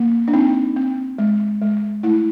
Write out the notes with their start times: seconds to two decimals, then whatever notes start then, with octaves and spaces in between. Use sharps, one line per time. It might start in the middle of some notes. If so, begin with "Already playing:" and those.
Already playing: A#3
0.28 D4
0.33 C4 D#4
0.76 C4
1.18 G#3
1.62 G#3
2.03 A3 E4